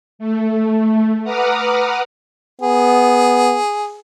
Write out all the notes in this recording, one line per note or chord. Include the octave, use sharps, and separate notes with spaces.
A3
B4 F#5 A#5 D6 D#6 F6
B3 G#4